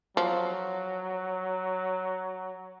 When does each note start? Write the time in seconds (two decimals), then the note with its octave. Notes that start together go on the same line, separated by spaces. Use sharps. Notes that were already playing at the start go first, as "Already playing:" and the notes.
0.17 F3 F#3